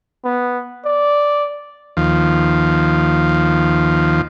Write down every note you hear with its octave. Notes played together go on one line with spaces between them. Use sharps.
B3
D5
D#2 F3